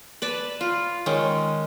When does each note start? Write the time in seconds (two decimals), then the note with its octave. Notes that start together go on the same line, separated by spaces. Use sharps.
0.22 B4 D5 A5
0.61 F4
1.06 D#3 G#3 C#4